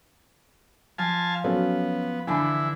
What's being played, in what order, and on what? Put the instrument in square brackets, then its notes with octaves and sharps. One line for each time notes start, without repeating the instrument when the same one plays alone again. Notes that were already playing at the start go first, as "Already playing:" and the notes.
[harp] F3 [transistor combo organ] F5 G#5 A5
[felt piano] F#3 C#4 A4 [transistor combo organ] B3
[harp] D3 E3 D4 [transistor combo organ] E4 [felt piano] G#5 B5